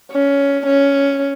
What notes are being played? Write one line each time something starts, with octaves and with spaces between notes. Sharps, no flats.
C#4
C#4